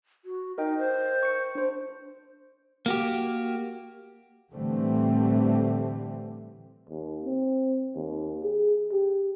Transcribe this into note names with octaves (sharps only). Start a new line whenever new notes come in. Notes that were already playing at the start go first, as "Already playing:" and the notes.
F#4
D#4 A#4 D#5 G5
C5
C#6 C#7
D4 C5
A#3 F#4 G4
A2 D3 E3 G3 A3 C4
D#2
C4
D#2
G#4
G4